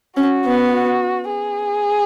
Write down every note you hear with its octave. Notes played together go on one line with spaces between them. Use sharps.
C#4 F#4
B3
F#4
G#4